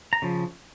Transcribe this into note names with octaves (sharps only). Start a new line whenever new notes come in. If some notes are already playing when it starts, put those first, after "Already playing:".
A#5
C#3 F3